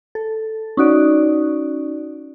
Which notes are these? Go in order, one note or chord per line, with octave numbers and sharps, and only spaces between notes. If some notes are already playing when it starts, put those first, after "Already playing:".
A4
C#4 D#4 F#4 D5